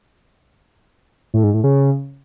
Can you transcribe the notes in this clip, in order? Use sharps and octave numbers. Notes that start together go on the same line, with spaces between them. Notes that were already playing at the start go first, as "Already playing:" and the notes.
A2
G#2
A2
C#3